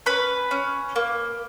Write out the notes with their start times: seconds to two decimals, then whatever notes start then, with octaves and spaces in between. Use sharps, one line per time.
0.06 C#4 B4 B5
0.51 C#4
0.96 A#3